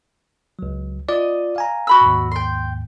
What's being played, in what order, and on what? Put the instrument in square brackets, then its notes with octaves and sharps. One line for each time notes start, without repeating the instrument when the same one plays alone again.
[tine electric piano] C#2 F#3
[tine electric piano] F4 D5 [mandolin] D#5
[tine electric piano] F5 G#5 A#5
[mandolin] F#4 B5 E6
[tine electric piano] D#2 G#2
[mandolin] G5 C6